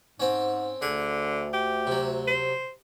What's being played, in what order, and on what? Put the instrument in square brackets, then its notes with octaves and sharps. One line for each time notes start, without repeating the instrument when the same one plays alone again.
[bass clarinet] G#2 [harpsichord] C4 C#4
[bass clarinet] D2 [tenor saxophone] D3 [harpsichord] G#4
[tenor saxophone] G4
[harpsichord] C3 F#3
[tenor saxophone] C5